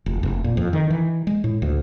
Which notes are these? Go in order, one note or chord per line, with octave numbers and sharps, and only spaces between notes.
F1
F1
A#2
F2
D#3
E3
G#3
A2
D2